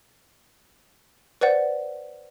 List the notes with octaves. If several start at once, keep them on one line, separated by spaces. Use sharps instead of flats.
B4 C5 D5 F#5